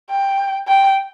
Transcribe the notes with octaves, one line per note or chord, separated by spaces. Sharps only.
G5
G5